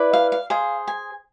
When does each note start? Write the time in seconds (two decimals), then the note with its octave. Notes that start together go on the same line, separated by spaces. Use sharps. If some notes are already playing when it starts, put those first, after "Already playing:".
Already playing: E4 B4 D5
0.13 F5
0.32 F5
0.50 G#4 C5 F5
0.88 G#5